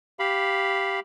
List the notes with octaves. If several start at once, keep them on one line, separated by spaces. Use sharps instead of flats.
G4 F5 B5